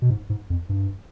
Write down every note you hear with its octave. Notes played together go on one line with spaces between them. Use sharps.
B2
G#2
G#2
F2
G2